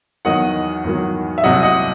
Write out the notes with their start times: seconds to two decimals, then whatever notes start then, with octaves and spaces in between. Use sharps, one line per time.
0.25 E2 D#3 F#3 D#5 F#5
0.84 E2 D#3 F#3
1.38 E5
1.44 C2 C3 F#3 D#5 F#5
1.63 D#5 F#5